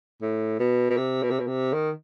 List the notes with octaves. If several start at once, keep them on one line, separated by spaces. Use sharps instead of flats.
A2
B2
B2
C3
B2
C3
B2
C3
D#3